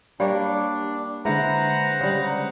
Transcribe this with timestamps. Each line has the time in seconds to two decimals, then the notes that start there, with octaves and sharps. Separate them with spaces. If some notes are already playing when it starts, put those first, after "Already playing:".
0.20 G3 A#3 D4 C#5
1.25 D3 G#3 E4 B4 C5 F#5 A#5
2.00 C#3 G3